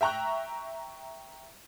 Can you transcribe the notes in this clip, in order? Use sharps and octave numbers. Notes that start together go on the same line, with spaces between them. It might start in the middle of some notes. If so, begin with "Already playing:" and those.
E5 G5 A#5 C#6 F#6